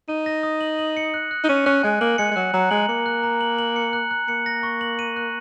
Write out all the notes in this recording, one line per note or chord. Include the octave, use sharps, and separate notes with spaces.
D#4 D#7
A#6
D#6
F#7
F#7
C#7
F#6
F#6
D#4
C#4 D#7
C#4 F#6
G#3 G#5
A#3 F#7
G#3 C#7
G#3
F#3 F#6
F#3 A#5
G#3 F#7
A#3 C#7
F#6
A#5
F#7
F#7
C#7
F#6
F#6
A#3 C#7
A#6
C#6
F#7
D#7
F#6